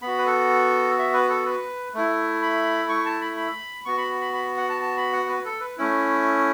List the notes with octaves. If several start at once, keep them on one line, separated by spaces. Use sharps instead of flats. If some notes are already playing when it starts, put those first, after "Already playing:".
B3 F#4 B5
B4
A4
E5
B4
A4
B4
A3 E4
B5
C#6
A5
B5
B5
B3 F#4 C#6
B5
B5
B5
F#5
A5
A5
B5
F#5
B4
A4
B4
A3 C#4 E4